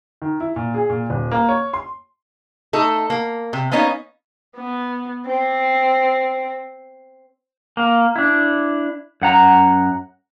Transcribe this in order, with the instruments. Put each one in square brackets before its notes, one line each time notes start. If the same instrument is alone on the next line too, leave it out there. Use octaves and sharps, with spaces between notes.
[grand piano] D#3
E4
A#2
G#4
A#2
D#1
A#3
C#5
C6
[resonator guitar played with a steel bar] A3 D#4 A4
A#3
C3
A#3 B3 C#4 D#4 C#5 F5
[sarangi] B3
C4
[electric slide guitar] A#3
D4 E4
F#2 F#5 A#5